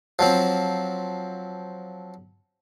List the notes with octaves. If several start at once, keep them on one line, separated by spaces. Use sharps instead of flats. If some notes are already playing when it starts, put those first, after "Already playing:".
F3 F#3 C4